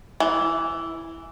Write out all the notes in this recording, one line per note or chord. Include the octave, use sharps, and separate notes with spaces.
E3